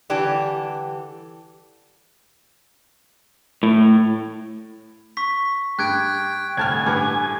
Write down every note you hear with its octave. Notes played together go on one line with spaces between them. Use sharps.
D3 E3 G3 G4 A4
A2
C#6 B6
G2 G5 F#6 G#6 D7
C2 A2 D3 G#5 A5 F6
G2 E3